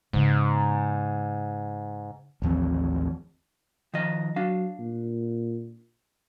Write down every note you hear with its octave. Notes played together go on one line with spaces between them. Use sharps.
G#2 C#3 B3
A1 D#2 F3 C4
D#3 F3 D#5
F#3 D4 F5
A#2